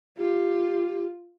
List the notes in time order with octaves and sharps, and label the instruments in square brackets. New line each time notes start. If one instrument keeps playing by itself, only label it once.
[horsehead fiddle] F4 [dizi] G4